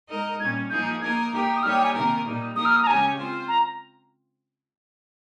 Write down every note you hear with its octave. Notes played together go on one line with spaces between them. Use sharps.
G#3 D#4 A#4 D#5
A#2 G3 C#4 G#6
F3 A#3 D#4 G#4 G6
A#3 D#4 A#4 G#6
A#3 D#4 G4 A#4
D#6
G3 A#3 D#4 G4 C#5 F6
G5
G#5
C3 D#3 A#3 D#4 A#4
A#2 G3 A#3 D#4
F3 A#3 D#4 G4 A#4 D#6
F6
D#6
A#5
C#3 G#3 C#4 G4 C#5 G#5
C4 F4 C5
A#5